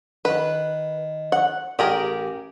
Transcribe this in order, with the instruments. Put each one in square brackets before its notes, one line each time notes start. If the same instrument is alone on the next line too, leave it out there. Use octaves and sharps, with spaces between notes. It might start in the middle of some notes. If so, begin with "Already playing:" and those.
[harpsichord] D#3 [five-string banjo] B4
[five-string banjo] F#5
[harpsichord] A1 [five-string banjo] G4 G#4 A#4